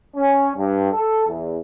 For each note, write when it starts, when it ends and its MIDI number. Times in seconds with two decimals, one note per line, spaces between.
0.16 0.51 61
0.56 0.89 43
0.92 1.27 69
1.28 1.60 40